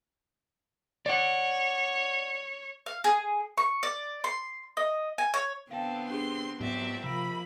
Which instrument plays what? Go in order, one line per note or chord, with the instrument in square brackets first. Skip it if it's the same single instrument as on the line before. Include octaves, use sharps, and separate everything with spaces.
[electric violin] C#5 [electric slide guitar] D5 F#5
[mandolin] F5
G#4
C#6
D5
C6
D#5
G#5
C#5
[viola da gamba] D3 B3 C4 [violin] A4 [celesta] F5 G5
[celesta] D4 G4 G#4 [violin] C6
[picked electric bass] G#2 B3 [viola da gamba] F#3 C4 [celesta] G4 [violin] D5 E5
[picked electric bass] C3 [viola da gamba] F3 [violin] A#3 B5 [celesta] E6 D7